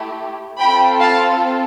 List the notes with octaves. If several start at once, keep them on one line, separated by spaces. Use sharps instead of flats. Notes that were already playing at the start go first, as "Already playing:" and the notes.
Already playing: A3 E4 G4
C4 F4 A4 G5 B5
F5 A5